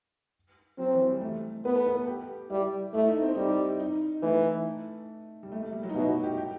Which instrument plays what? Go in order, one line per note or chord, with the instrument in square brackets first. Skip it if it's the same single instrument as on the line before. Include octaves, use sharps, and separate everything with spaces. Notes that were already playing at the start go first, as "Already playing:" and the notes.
[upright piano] F#3 [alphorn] C4
[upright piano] E3
G3
A3
[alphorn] B3 [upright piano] B4
[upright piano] A4
B4
A4
G4
[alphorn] G3 [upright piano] E4
[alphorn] A3 [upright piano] E4
[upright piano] D#4
C4
[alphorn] G3 [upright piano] D#4
[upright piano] D#4
[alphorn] E3 [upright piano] A3
[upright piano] G3
A3
A3
G3
F#3
D#4
[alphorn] B2 [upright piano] E4
[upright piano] F#4
G4
G4